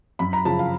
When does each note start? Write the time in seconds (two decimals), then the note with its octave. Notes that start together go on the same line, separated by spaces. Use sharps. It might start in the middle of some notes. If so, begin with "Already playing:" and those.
0.19 F#2 B5
0.33 A#5
0.45 C#3 F3 A5
0.59 F5